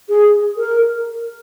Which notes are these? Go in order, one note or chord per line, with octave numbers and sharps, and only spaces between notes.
G#4
A#4